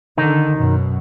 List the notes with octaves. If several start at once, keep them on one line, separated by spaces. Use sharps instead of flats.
D3 D#3 D#4
F#2 B2